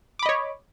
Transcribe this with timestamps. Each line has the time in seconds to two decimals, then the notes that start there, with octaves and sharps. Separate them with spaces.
0.19 D6
0.23 B5
0.26 D#5
0.29 C#5